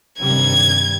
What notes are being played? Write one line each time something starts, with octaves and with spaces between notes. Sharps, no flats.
G2 C3 D#3 G3 G#6